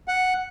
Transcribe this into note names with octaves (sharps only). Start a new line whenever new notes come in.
F#5